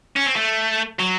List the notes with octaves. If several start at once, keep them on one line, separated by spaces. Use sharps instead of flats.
C#4
C4
A3
F#3